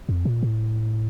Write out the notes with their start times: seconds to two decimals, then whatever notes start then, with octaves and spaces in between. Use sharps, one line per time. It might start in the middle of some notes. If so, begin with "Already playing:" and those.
0.09 F2
0.25 A#2
0.43 A2